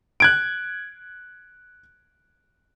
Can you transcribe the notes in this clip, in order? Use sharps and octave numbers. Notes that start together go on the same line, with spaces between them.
F#6 G#6 D7